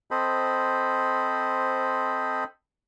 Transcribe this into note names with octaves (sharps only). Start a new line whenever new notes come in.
C4 A4 C5 D#5 B5